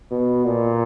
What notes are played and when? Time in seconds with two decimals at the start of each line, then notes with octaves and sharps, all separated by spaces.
0.11 B2
0.45 A#2